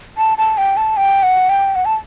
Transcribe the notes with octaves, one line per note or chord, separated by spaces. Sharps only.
A5
A5
G5
A5
G5
F#5
G5
F#5
A5